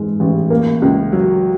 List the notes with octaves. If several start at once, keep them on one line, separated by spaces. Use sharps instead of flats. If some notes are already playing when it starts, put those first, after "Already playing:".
Already playing: G#2 E3 G#3
A1
A#3
C#2
F#3